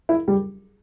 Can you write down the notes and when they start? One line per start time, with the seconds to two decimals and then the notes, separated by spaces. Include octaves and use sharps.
0.09 E4
0.28 G3 G4